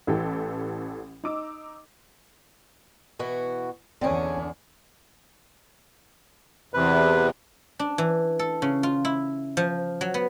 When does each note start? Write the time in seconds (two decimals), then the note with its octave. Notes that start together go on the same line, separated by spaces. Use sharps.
0.07 A1 E3 G4 A4 G5
1.24 D#4 D6 E6
3.19 B2 E3 F#4
4.01 E2 D3 C#4 D4 G#4
6.74 E2 C3 B4
7.79 D4
7.98 E3
8.39 A4
8.62 C#3
8.83 F4
9.05 E4
9.57 F3
10.01 F#3
10.14 B3